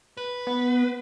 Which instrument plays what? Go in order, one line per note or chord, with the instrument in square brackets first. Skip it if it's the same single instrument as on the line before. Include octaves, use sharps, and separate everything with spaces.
[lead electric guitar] B4
[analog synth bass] B3